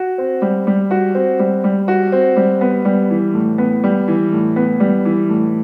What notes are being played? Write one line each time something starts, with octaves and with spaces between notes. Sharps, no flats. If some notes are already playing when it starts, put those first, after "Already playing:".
Already playing: F#4
C4
G3
G3
F#4
C4
G3
G3
F#4
C4
G3
B3
G3
E3
A2
B3
G3
E3
A2
B3
G3
E3
A2